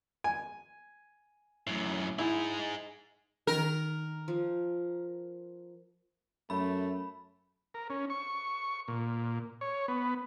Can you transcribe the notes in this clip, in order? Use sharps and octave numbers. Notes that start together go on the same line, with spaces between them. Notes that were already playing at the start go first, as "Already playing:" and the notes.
G#5
F#2 A2
D#4 E4 G#4
D#3 A#4
F3
F#2 A3 B5
A#4
C#4
C#6
A#2
C#5
B3